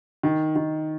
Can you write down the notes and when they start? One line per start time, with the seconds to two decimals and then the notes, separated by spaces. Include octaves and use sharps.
0.23 D#3
0.56 D#3